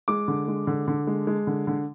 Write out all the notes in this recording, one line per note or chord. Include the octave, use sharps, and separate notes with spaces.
G#3 D6
D3
G#3
D3
D3
G#3
G#3
D3
D3